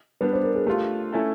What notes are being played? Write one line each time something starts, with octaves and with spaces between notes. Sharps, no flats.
G3 B3 D4 G4 B4
C5
A#4
G#4
A3 D4 F4 G4
A3 C#4 E4 A4